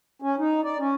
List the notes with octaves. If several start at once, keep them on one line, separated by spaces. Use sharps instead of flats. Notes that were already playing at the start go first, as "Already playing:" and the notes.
C#4
D#4
D5
C#4